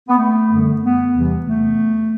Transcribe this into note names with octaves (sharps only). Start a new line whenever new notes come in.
B3
A3
F#2 D3 G3
B3
E2 C3 E3 G3
A3